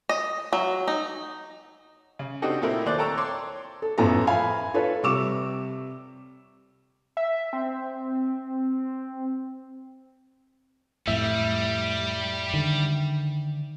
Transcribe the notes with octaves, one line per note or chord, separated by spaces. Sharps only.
D#5
F#3
D#4
C#3
C4 D4 D#4 F#4 G4 A4
A#2 A3 C4 E4 A#4
D#2 C5 D5 F#6
A4 G5 A5 A#5 C#6 E6
C#5 C6 D6
A4
A1 F#2 F3 B3 A4 A#5
E5 F5 G#5 B5
F4 A4 B4 C#5
C3 G3 C#6 D6 E6 E7
E5
C4
F2 A2 G3 E5
D3 D#3